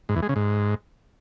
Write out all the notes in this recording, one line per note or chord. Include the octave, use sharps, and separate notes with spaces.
G#2
E2
G#3
C#3
G#2